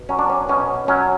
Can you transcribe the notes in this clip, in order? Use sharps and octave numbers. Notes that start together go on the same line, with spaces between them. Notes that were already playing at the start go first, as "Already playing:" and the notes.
Already playing: B2
F#3 C#4
D4
C#4
B2 C#4
F#3 C#4